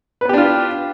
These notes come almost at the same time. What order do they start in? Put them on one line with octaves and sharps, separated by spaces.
B4 B3 G4 D4 F4